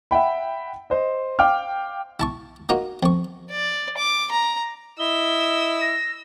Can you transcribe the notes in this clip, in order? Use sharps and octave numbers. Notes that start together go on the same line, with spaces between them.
E5 F#5 G5 B5
C5 D#5
F5 G5 D6 F6
E4 A5 C#6
A#3 D#4 F4 F#4
F2 C#6
D5
D6
A#5
E4 D#5 E6 G7
A#6